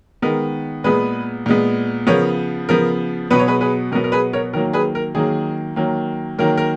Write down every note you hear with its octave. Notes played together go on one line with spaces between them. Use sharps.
D#3 G#3 B3 A#4
A#2 G#3 B3 G#4 B4
A#2 G#3 B3
C#3 F3 B3 A#4 C#5
C#3 F3 B3 A#4
B2 F#3 B3 B4
C#5
G#4 B4
G#4 B4
B2 F#3 B3 A#4
A#4
G#4 B4
A#4 C#5
D#3 F#3 A#3 A#4
G#4 B4
A#4
D#3 F#3 A#3 G#4
D#3 F#3 A#3
D#3 F#3 A#3 A#4
A#4